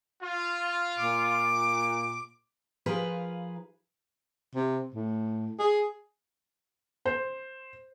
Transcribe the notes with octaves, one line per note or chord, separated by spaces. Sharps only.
F4
A#2 D6
F3 F4 G#4 A#4 B4 G#5
C3
A2
G#4
C5